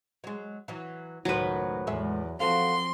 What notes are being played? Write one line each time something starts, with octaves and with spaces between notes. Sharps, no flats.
F#3 G#3
E3 F#3
C#2 F#2 A2 D#3 F#3 B4 C5
E2 A2 G#3 E5
F3 C4 F#4 A4 F5 C6